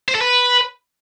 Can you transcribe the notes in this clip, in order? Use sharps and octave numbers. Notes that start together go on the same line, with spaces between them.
C5
A4
B4